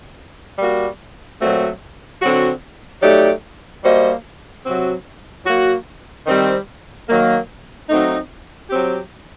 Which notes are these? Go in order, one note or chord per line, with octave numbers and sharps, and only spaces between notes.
G3 A#3 F#4
A#2 F#3 A3 C4 F#4
D3 F#3 C4 F#4
F#3 A3 D#4 G4 D5
G3 A#3 F#4 C5 D#5
C3 F#3 C4 F#4
F#3 A#3 F#4
D#3 G3 C4
D#3 F#3 A#3
F#3 A3 C4 D#4
F#3 C4 G4